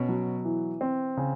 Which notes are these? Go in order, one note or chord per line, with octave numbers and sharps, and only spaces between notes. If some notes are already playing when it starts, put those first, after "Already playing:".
Already playing: B2 C#4
F#3
E3
C4
C#3